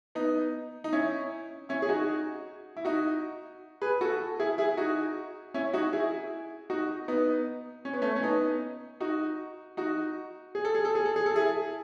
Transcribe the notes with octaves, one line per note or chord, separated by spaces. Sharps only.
B3 D#4
D#4
C#4 E4
C#4 E4
G#4
D#4 F#4
E4
D#4 F#4
G#4 B4
F#4 A4
E4 G#4
E4 G#4
D#4 F#4
C#4 E4
D#4 F#4
E4 G#4
D#4 F#4
B3 D#4
C#4
B3
A3 C#4
C#4
B3 D#4
D#4 F#4
D#4 F#4
G#4
A4
G#4
A4
G#4
A4
G#4
A4
E4 G#4